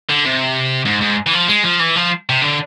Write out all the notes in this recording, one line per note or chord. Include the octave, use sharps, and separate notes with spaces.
D3
C3
G#2
G#2
E3
F3
G#3
F3
E3
F3
C3
D3